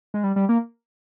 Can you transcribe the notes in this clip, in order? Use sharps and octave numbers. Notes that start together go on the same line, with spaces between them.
G#3
G3
G3
A#3